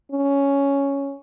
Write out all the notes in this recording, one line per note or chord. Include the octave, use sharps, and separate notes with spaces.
C#4